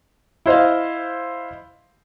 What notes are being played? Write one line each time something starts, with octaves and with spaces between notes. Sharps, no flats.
E4 C5 D#5 F5